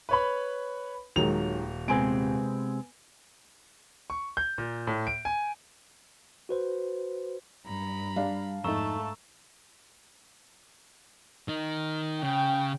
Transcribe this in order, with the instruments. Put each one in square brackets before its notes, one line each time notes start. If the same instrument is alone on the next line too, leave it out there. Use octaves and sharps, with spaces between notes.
[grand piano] B4 C#5 B5
[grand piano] D#1 F7 [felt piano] D#3 F#3 G#3
[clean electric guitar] C3 G#3 C4 [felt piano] B3 G#5 D7
[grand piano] C#6
G6
A#2
A2
D7
G#5
[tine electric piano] F#4 B4 C5
[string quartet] G2 A#5 B5
[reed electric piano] G3 [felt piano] D4 F5
[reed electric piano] F2 D#4 [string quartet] G#2 A3 A5 [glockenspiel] A#5 C#6 E6
[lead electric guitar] D#3 D#4
[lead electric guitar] C#3 [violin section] G5